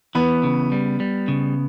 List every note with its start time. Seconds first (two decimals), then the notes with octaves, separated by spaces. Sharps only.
0.15 E3 B3
0.43 C#3
0.72 G3
1.00 G3
1.28 C#3